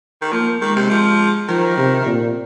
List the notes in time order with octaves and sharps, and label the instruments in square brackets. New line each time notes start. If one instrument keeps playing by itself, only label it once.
[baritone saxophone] D#3
[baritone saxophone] F3 [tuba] A#3
[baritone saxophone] D#3 [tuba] G#3
[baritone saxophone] C3
F3
[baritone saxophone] D#3 [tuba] F3
[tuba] C3
A#2